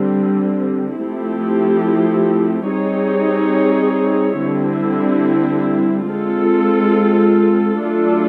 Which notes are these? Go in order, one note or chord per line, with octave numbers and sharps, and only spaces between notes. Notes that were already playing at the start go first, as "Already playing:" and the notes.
Already playing: D3 G3 C4
F3 A3 C4 E4 G4
G3 C4 D#4 G#4 C#5
D3 G3 C4 E4
G#3 C4 F4 A4
F#3 A3 D4 F4 A4